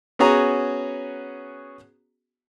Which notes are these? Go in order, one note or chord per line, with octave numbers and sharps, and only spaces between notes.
B3 C#4 F#4 G#4 A#5